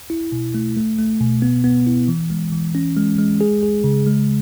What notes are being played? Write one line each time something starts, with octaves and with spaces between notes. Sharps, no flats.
E4
B2
A3
A3
A3
B2
B3
B3
E4
E3
G#3
E3
C#4
G#3
G#3
G#4
G#4
C#3
G#3